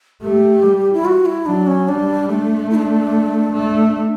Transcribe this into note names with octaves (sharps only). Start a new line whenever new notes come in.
A3 G4
G3
E4
F#4
E4
F#3 D4
C#4
G3 D4
A3 D4
E4
D4
A3